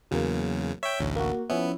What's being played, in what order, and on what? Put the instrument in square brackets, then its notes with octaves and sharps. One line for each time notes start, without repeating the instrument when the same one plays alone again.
[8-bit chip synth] E2 C#3 [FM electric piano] F#3 A#3
[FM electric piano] C#5 [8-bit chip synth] E5 G5
[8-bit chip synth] A1 D2
[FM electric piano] A#3 F#4
[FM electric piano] F3 C#4 E4 [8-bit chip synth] B3